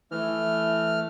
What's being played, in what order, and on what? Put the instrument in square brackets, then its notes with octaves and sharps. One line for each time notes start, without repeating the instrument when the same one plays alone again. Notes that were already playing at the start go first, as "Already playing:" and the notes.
[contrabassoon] E3 [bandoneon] A3 F6